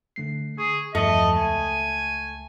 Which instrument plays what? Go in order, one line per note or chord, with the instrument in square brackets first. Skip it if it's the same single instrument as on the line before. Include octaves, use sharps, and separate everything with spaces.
[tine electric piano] D3 A3 C7
[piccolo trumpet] G#4 [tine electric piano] C#6
[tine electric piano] E2 G2 F3 [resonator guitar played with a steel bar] A3 [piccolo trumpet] D#5
[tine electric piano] C#2 [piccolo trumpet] G#5